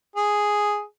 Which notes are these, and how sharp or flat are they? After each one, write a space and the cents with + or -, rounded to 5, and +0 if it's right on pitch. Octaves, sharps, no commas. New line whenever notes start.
G#4 +0